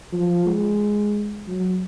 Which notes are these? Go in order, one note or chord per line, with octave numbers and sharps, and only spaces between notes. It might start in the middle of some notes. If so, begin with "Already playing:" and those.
F3
G#3
F#3